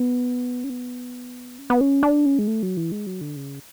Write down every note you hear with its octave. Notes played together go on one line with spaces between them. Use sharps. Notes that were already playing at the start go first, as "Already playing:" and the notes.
Already playing: B3
C#4
B3
C#4
B3
C#4
D4
C#4
G#3
A3
F#3
E3
G#3
F#3
D3
C#3